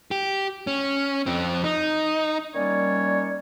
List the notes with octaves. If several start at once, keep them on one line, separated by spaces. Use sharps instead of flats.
G4
C#4
F2 C4
D#4
D#3 G3 A#3 C#4 C#5 D5